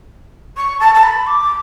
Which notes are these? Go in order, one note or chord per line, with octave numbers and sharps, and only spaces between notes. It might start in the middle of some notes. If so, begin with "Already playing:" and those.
C#6
A5
A5
B5
D6